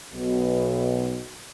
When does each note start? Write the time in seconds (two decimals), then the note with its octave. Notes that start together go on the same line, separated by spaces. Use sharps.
0.13 B1 B2